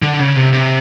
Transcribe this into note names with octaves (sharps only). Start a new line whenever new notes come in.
D3
C#3
C3
C3